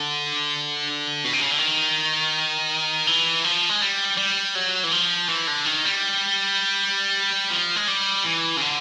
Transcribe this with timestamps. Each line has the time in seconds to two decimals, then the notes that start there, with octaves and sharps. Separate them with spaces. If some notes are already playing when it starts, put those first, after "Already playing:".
Already playing: D3
1.25 B2
1.33 C3
1.41 C#3
1.50 D3
1.59 D#3
3.07 E3
3.44 F3
3.69 G#3
3.81 G3
4.18 G3
4.55 F#3
4.84 E3
4.92 F3
5.29 E3
5.47 D3
5.66 D#3
5.85 G3
7.50 F3
7.76 G#3
7.88 G3
8.25 E3
8.57 C#3
8.61 D3